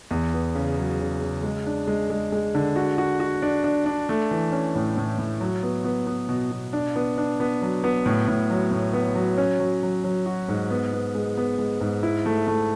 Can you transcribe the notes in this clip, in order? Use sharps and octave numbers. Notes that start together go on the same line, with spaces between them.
E2
B3
C#3
F#3
C#3
C#3
G#3
D4
G#3
G#3
G#3
D3
F#4
F#4
F#4
D4
D4
D4
A3
E3
C#4
A2
A2
A2
F#3
B3
B3
B3
B2
B2
D4
B3
D4
B3
F#3
B3
A2
A2
F#3
A2
B3
F#3
C#4
F#3
F#3
F#3
F#4
G#2
B3
B3
G#3
B3
G#3
G#2
E4
A3
A3